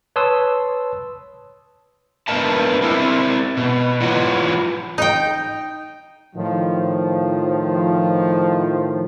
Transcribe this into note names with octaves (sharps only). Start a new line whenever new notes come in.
B4 C#5 A5 C6 D#6 E6
B3 D4 A#4 D#5 E5 A5
C4 E4 A#4
B2
E3 F#3 F4 F#4
D#4 G5
A2 D#3 F3